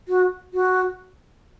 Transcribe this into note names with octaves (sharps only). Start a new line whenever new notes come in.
F#4
F#4